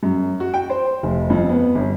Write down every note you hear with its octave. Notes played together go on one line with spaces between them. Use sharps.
F#2
F#4
G5
C5
F1
F2
B3
G1